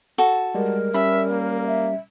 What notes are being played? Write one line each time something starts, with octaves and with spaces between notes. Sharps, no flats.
F#4 A4
G3 G#3 A#4
G3 C#4 D5 E5 B5
A#3
E5